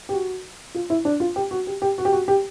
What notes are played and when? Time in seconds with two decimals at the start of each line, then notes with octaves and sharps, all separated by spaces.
0.09 G4
0.13 F#4
0.75 F4
0.90 E4
1.05 D4
1.20 F4
1.36 G4
1.51 F#4
1.67 G4
1.82 G4
1.98 F#4
2.05 G4
2.12 F#4
2.28 G4